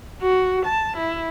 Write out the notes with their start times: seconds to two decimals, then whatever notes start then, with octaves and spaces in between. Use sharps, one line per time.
0.22 F#4
0.66 A5
0.97 E4